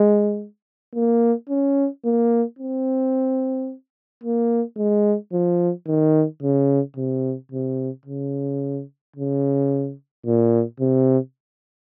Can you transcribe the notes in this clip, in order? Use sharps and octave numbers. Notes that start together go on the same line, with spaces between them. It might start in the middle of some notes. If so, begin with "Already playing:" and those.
Already playing: G#3
A#3
C#4
A#3
C4
A#3
G#3
F3
D#3
C#3
C3
C3
C#3
C#3
A#2
C3